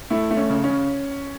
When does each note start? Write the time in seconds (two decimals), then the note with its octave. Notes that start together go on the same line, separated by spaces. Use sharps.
0.10 A3 E4
0.31 A3
0.37 C#4
0.50 C#3
0.64 C#4
0.70 C#3